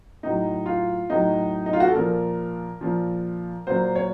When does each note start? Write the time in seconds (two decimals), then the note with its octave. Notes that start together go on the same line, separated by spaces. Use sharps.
0.23 A2 F#3 D#4
0.66 F4
1.10 A2 F#3 D#4
1.66 D#4
1.73 F4
1.80 F#4
1.88 A4
1.95 A#2 F3 A#4
2.81 A#2 F3
3.67 A#2 F#3 C5
3.96 C#5